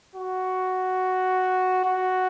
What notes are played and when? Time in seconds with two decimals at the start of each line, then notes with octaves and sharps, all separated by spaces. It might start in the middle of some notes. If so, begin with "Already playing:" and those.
0.15 F#4
1.85 F#4